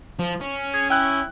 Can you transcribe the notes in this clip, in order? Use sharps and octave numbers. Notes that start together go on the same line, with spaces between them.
F3
C#4
G#4
E4 G5 F#6